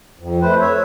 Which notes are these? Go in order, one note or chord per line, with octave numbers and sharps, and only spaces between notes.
F2
A3 B4 C5
C#5 E5